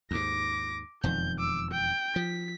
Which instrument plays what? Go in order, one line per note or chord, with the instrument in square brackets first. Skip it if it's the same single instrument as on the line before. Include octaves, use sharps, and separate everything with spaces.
[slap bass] D#2 G#2 [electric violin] D6 A#6
[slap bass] E1 F2 D#3 [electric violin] G6
[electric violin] D6 E6
G5
[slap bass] F3 [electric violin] B6